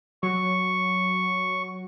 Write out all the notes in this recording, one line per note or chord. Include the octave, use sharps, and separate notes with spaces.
F#3 C#6